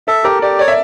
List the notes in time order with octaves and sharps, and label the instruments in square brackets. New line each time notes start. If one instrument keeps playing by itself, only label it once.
[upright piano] A4 [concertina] E5
[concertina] G4 [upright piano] A#4
[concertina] G4 [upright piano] D5
[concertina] C#5 [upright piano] D5
[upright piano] E5